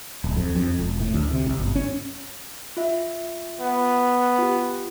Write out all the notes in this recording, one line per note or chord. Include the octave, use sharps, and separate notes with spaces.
D1
F2
F2
E1
A2
D2
C3
C2
G1
C#4
F4 E5
B3
F4 G4